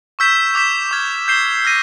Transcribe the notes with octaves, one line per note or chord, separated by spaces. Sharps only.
C#6 E6 G6 B6 E7
D6 G6 B6 E7
D6 F6 G#6
G6 C7 E7 G7
F6 A#6 D#7